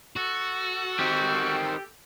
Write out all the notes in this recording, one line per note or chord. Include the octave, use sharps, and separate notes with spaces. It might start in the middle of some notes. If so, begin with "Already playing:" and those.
F#4 A4
D#3 C4 G4